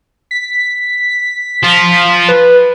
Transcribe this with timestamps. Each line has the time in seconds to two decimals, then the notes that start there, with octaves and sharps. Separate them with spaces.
0.31 B6
1.63 F3 F4
2.28 B4